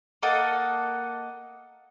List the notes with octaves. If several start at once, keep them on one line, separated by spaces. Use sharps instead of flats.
A#3 A4 D#5 F#5